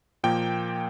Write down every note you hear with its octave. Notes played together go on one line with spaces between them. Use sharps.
A#2 F3 A#3 G5